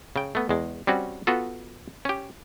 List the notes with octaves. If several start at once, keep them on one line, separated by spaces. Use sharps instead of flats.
C#3 G5
A3 B3
E2 G#3
G3 C4 C#4 F#4
B3 F4 F#4 A4
C#4 G4